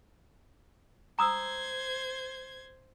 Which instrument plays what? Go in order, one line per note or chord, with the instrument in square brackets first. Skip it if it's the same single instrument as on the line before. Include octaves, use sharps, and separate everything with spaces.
[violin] C5 G#6 [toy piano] A#5 D#6 E6